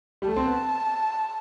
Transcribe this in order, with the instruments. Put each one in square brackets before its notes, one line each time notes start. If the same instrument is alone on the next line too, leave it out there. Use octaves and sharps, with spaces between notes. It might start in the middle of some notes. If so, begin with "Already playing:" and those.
[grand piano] G3
[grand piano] A3 [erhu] A5
[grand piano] C4
B3